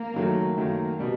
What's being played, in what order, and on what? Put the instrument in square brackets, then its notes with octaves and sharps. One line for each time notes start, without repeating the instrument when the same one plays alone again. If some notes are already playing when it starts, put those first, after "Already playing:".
Already playing: [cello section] A#3
[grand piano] F#2 D#3 F#3 A3
[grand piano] F#2 D#3 F#3 A3 [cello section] A#3
[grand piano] B2 G3